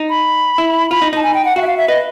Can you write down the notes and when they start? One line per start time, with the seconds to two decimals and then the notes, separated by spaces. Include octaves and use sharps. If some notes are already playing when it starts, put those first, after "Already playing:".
Already playing: D#4
0.10 B5
0.58 E4
0.91 F4 B5
1.02 D#4
1.13 D#4 A5
1.23 G#5
1.34 G5
1.45 F#5
1.56 F#4 F5
1.62 E5
1.67 F5
1.77 E5
1.88 B4 D#5